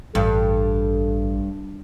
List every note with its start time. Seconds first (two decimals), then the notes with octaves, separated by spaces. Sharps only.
0.15 A1 G2 A4